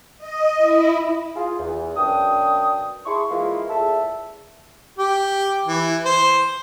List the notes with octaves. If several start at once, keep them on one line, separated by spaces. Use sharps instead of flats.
D#5
E4
F4 G#4
E2
F#2 B2 D4 G5 D#6
E4 G#4 A5 C6 C#6
E3 G#3 A#3 E4 F4
E2 A4 E5 A5
G4
E3
C5